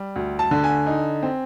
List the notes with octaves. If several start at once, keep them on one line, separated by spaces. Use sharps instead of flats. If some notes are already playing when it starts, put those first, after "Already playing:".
Already playing: G3
D2
A5
D3
G#5
D#4
C4